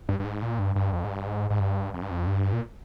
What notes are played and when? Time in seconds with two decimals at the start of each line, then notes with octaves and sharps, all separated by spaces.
0.09 G2
0.20 G2
0.25 G#2
0.42 A#2
0.59 G2
0.76 G2
0.93 F2
1.04 G#2
1.09 G2
1.27 G#2
1.50 G#2
1.60 G2
1.94 F2
2.02 G2
2.11 F2
2.27 G2
2.53 A#2